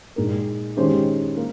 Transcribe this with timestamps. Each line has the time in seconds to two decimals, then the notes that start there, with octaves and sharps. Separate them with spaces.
0.16 A#2 G#3 D#4 A#4
0.77 D#3 G#3 C#4 G4 C5
1.37 A#3